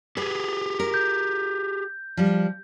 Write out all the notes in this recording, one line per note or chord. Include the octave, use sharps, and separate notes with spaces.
G4 G#4 B4
A#4
G6
F3 G3